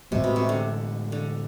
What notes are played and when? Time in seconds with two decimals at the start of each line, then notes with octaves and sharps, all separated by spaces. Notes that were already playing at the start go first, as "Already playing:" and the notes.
0.11 A2 C3 E3 G#3 B3
0.24 B2
0.36 C3
0.49 D3
1.12 D3